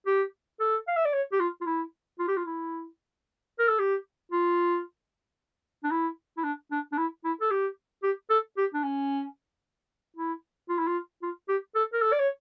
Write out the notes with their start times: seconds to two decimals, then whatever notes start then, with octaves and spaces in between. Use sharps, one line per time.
0.06 G4
0.60 A4
0.88 F5
0.96 E5
1.05 D5
1.14 C#5
1.32 G4
1.40 F4
1.61 F4
1.66 E4
2.19 F4
2.28 G4
2.37 F4
2.46 E4
3.59 A#4
3.69 A4
3.79 G4
4.32 F4
5.84 D4
5.91 E4
6.37 E4
6.44 D4
6.71 D4
6.92 D4
6.98 E4
7.24 E4
7.41 A4
7.51 G4
8.03 G4
8.30 A4
8.57 G4
8.74 D4
8.83 C#4
10.17 E4
10.69 F4
10.78 E4
10.87 F4
11.23 F4
11.49 G4
11.75 A4
11.93 A#4
12.02 A4
12.12 D5
12.20 C#5